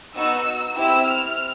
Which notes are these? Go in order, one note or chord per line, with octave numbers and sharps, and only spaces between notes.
B3 D#4 F#4 E6
C4 E4 G4 E6
F6